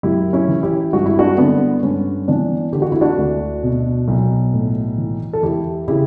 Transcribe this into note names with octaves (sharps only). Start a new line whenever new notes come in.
F#2 E4 G4
C#4 E4
E3
E4 G4
G2 F#4
E4
D4 F#4
D3 B3 D4
G2 C#4
E3 B3 D4
D3 G4
F#4
E4
D4 F#4
D2
B2
B1
A2
E3
A4
E2 E4 G4
C#3 E4 G4